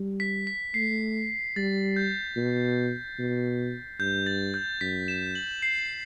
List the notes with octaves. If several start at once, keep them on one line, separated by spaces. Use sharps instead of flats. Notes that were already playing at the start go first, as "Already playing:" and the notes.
Already playing: G3
B6
B6
A3 C7
G3 A6
G6
B2
B2
G2 G6
A6
G6
F#2 B6
E7
F#7
C7